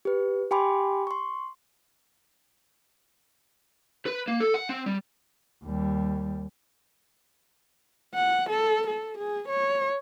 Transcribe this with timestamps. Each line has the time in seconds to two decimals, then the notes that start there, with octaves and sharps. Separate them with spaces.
0.05 G4 B4
0.51 G4 G5 G#5 B5 C6 D6
1.07 C6 C#6
4.06 B4
4.28 A#3
4.40 A4
4.54 F#5
4.69 C4
4.86 G3
5.64 D#2 G3
8.14 F#5
8.49 A4
8.87 A4
9.18 G#4
9.48 C#5